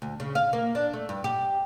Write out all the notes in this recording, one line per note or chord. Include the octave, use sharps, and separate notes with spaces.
D2
C#3
F5
A#3
D4
A3
G2
G4